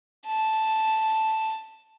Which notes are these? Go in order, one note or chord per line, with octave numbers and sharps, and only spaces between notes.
A5